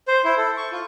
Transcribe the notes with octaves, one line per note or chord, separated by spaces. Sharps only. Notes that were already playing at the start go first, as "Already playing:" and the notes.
C5
E4
A4
C#6
F4